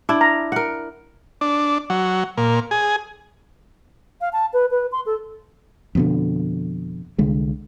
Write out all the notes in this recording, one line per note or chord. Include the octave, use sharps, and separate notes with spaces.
D4 E4
A#5
A#4 F#5
D4
F#3
A#2
G#4
F5
A5
B4
B4
C6
A4
F2 B2 D3
C2 D3 G#3